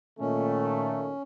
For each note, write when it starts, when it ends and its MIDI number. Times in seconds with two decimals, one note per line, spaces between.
0.20 1.11 46
0.20 1.11 51
0.20 1.11 57
0.20 1.22 61